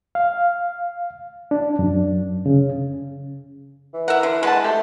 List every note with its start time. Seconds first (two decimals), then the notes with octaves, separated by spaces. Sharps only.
0.15 F5
1.51 D4
1.79 F#2
2.46 C#3
3.94 E3
4.08 A#4 E5 F#5
4.23 D3
4.43 G#3 B4 F#5 A5
4.64 A3 G4 C5